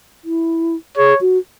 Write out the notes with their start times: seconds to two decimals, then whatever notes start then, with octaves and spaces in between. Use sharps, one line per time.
0.25 E4
0.97 G#4 C#5
1.21 F#4